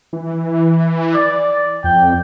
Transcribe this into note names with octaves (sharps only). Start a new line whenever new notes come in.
E3
D5
F2 G5